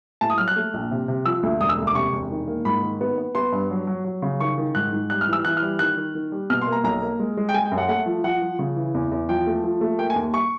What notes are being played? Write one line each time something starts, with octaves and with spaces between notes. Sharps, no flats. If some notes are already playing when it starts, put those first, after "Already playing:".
A2 A5
D#6
F#3 F6
F#6
A3
A#1
C3
C3
F3 E6
D2
E1 D#6
E6
D2
D6
C3 C#6
E1
D#3
A#3
G#2 B5
D#3
B3
B3
B3 C6
G2
F#3
F#3
F#3
C#3
D#3 C#6
D#3
G#2 F#6
G#2
G3 F#6
F6
E3
E6
E3 F#6
F6
G3
D#3 F#6
D#3
D#3
G3
B2 F6
C6
A#3
A#5
B1 A#5
A#3
G#3
G#3
G5
G#3 G#5
G5
F#2
F#5
A3 F#5
F3
F3 F#5
F3
C#3
E3
E2
E2
F3 G5
A3
F3
A3
A#3 G5
G#5
D#2
C#6